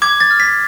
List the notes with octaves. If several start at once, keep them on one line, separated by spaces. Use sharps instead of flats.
D6 G#6
A6
F6
B6